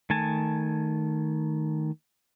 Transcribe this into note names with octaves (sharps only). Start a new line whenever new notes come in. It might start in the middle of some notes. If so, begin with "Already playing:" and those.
D#3 A3 G#5 A5